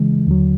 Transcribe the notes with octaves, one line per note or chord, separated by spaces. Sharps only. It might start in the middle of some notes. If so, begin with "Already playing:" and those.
Already playing: C#3 E3 G#3
D#2 D3 F#3